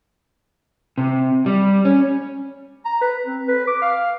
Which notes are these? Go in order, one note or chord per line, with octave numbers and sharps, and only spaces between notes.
C3
G3
C#4
A#5
B4
C4
B4
D6
F5